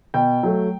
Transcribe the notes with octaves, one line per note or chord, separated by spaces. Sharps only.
B2 G5
F#3 A3